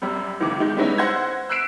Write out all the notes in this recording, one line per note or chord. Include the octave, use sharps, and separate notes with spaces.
F#2 G3
F#1 C#2 D#3 E3 D6
D#3 G#3 G6
G3 G#3 B3 C#4 D#4 E4
C5 F#5 E6 G6 G#6 A#6
E6 F#6 B6 C7 D7 E7